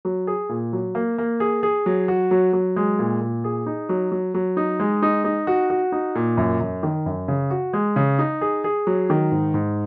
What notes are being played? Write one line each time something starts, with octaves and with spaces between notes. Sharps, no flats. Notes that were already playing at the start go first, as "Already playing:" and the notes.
F#3
G#4
A#2
F#3
A#3
A#3
G#4
G#4
F#3
F#4
F#3
F#3
G#3
A#2
A#2
G#4
D#4
F#3
F#3
F#3
D#4
G#3
D#4
D#4
F#4
F#4
D#4
A#2
F#2
F#2
D#3
F#2
C#3
F#4
G#3
C#3
D#4
G#4
G#4
F#3
D#3
G#2
G#2